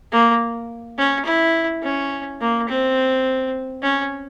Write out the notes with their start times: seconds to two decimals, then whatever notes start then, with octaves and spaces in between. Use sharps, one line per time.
0.12 A#3
0.98 C#4
1.25 E4
1.83 C#4
2.41 A#3
2.69 C4
3.82 C#4